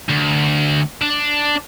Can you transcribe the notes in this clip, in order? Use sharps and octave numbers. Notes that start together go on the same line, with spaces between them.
D2
D4